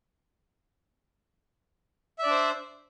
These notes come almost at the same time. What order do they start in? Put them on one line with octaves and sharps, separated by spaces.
E5 D5 D4 C5